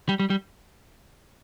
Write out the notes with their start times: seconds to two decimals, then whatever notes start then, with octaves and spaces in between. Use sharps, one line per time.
0.09 G3
0.19 G3
0.30 G3